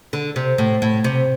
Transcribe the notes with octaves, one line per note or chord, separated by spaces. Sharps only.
D3
C3
A2
A2
C3